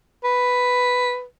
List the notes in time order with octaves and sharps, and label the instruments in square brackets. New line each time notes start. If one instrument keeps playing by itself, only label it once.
[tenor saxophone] B4